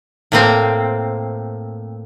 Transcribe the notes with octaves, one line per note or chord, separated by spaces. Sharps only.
A2 A#3 C4